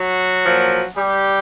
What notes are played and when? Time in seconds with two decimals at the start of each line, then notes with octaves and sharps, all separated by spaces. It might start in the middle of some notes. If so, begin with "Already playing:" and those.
Already playing: F#3 F#4
0.44 A#2 F3
0.96 G3 G4